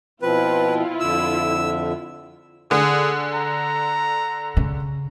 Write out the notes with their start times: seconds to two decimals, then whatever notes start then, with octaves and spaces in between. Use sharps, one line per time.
0.22 B2 F3 C4 E4 F4 B4
1.00 F2 D3 E5 E6
2.71 D3 G#4
3.34 A#5
4.57 C#3